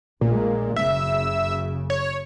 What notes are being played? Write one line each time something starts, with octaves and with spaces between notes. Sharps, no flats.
A#1 A#2 G#3
F#1 C#3 E5
C#5